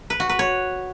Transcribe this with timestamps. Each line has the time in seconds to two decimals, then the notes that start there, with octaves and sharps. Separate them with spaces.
0.10 B4
0.20 F#4
0.29 B4
0.39 C#5